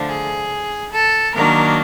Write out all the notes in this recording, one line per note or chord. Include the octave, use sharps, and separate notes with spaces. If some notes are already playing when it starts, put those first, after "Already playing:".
Already playing: D3 F3 A3 D4
G#4
A4
D#3 F#3 A#3 D4 A#4